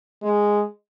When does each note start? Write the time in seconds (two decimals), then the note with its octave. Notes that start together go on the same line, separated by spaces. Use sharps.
0.23 G#3